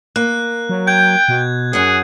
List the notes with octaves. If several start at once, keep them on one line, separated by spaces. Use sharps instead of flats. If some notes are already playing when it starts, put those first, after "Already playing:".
A#3 F#6
F#3
G5 G6 G#6
B2
F#2 G#4 F#5